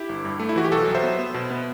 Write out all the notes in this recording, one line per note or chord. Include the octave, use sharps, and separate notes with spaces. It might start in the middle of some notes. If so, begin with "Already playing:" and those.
Already playing: E4 G4
G1
G2
A3
E4
E3 F#4
G4
B1 F#4 A4
F#3
C5 E5
B3
B3
B2
B3